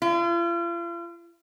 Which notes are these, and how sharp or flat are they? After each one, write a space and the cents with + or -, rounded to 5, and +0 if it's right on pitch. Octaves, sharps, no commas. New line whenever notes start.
F4 -40